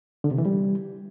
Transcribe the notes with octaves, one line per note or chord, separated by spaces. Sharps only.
D3
C3
E3
G3